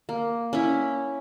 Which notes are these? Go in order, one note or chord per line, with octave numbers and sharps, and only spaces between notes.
A#3
C#4 E4